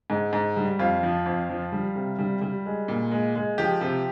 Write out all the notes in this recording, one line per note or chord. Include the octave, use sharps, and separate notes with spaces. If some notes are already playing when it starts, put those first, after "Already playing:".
G#2
G#2
G3
F2 F4
F3
F2
F3
G3
C3
G3
G3
G#3
A#2
G#3
G#3
F3 G4
C3